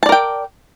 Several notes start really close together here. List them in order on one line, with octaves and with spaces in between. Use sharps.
A5 D5 A#4 G5